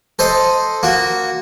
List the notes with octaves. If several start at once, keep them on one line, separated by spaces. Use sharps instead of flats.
A4 C5 D#5
A#3 F#4